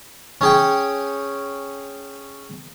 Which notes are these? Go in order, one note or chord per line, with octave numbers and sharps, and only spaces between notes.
C#4 G#4 G5